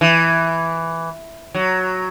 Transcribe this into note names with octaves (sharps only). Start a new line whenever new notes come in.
E3
F#3